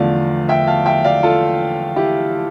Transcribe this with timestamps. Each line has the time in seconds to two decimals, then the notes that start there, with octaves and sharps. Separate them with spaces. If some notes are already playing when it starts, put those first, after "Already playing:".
Already playing: E2 D3 F3 A3 D5 F5
0.49 E5 G5
0.67 F5 A5
0.86 E5 G5
1.04 D5 F5
1.23 F4 A4
1.96 E4 G4